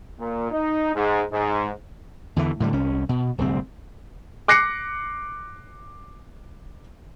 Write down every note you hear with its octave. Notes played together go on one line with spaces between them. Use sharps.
A#2
D#4
G#2
G#2
E2 D3 E3
A2 D3 F#3 G3
C2 C#4
B2
D1 C2 C4
D6 F#6 A#6 C7 C#7